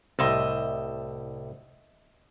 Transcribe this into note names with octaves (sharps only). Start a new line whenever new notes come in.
C2 A2 G3 D#5 E5 C6